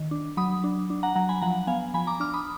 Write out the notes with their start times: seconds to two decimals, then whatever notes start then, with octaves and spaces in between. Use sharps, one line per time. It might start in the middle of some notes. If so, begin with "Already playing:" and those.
Already playing: D#3
0.11 D4
0.37 F#3 B5 D#6
0.64 D4
0.90 D4
1.03 F#5 A#5
1.15 F#3 F#5 A#5
1.29 G#5 B5
1.41 F3 F#5 A#5
1.67 B3 F5 G#5
1.94 F3 G#5 B5
2.07 A#5 D6
2.20 D4 D6 F6
2.33 B5 D#6